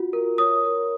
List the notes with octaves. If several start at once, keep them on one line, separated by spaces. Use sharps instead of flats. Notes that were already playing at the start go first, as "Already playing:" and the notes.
Already playing: F4 F#4
A#4
C#5 D#6
A#4